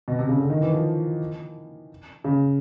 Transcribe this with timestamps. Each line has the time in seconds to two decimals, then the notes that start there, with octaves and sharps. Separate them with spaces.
0.08 B2
0.19 C3
0.29 C#3
0.39 D3
0.50 D#3
0.61 E3
0.73 F3
2.24 C#3